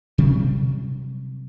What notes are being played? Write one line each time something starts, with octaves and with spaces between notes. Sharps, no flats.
C3 F#3 G3 C4